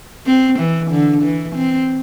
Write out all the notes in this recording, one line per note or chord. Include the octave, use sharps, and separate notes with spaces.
C4
E3
D3
E3
C4